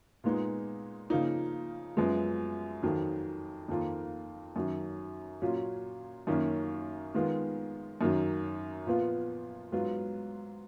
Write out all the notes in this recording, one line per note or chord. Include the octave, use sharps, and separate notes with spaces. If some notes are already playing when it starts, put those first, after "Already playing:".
A#2 G#3 B3 D#4
C#3 F3 A#3 D#4
F#2 F3 G#3 B3
F2 D#3 F#3
F2 D#3 A#3 F4
F#2 D#3 F#3
A#2 F#3 C#4 F4
F#2 D#3 A#3 C#4 F4
D#3 G#3 B3 F4
F#2 D#3 F#3
A#2 F3 B3 F4
G#2 F#3 B3 F4